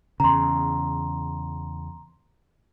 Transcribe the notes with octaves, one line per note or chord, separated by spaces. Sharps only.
E2 C#3 A#5 C6